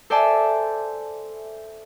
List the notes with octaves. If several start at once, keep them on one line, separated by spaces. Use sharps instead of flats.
A4 C5 D5 E5 G#5 A5